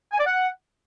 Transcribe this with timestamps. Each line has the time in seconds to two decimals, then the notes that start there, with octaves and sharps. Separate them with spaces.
0.12 G#5
0.19 D5
0.26 F#5